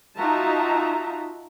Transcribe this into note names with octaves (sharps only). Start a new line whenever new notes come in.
D#4 F4 F#4 E5 A5 A#5